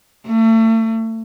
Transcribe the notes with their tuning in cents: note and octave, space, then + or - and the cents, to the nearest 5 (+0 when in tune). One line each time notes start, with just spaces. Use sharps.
A3 +35